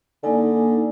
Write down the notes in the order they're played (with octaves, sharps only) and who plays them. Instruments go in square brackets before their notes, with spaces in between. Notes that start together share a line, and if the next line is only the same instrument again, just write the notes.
[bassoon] D3 [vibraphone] A#3 D#4 G#5